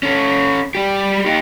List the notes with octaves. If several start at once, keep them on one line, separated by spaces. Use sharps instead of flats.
C#4 A4
G3 G4
D#4 G4